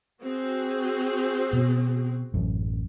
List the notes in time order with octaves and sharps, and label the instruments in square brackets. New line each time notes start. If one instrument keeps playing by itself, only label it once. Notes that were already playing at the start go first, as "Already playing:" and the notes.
[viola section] C4 F#4 G#4
[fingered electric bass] B2
A1 F#2